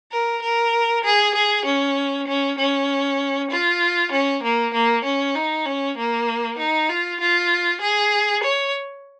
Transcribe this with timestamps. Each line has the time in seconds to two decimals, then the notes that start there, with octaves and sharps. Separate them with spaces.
0.12 A#4
0.42 A#4
1.04 G#4
1.35 G#4
1.65 C#4
2.28 C#4
2.58 C#4
3.51 F4
4.12 C#4
4.43 A#3
4.74 A#3
5.05 C#4
5.35 D#4
5.65 C#4
5.97 A#3
6.59 D#4
6.89 F4
7.20 F4
7.81 G#4
8.43 C#5